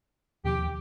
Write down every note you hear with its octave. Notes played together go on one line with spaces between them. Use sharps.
D#2 B2 F3 G4